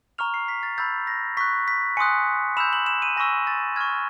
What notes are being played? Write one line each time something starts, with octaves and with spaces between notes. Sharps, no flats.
A#5 C#6 F6 F7
C7
B6
A6
B5 E6 G6 A6
A#6
C#6 F#6 B6
B6
G#5 C6 D#6 F#6 C#7
B5 E6 G6 E7
F#7
E7
D#7
G#5 C#6 E6 A#6
A6
C#6 F6 G#6